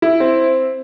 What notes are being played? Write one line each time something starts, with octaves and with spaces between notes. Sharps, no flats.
E4
C4